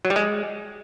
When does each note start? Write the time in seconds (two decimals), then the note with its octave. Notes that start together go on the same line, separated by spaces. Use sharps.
0.05 F#3
0.10 G3
0.16 G#3